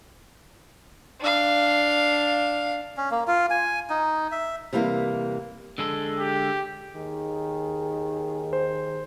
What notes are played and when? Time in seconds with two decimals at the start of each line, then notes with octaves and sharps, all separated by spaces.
1.20 D4 F5
2.97 C#4
3.11 A#3
3.28 F4
3.50 G#5
3.90 D#4
4.32 E5
4.73 C3 E3 G3 G#3 A#3
5.78 D3 G#3 A4
6.19 G4
6.95 D#2 D#3 G#4
8.53 C5